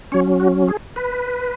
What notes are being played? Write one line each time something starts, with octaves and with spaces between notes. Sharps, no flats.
F#3 C#4 C#5
F#4
G#4
B4